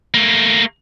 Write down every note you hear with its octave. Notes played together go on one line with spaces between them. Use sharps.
A3 A#3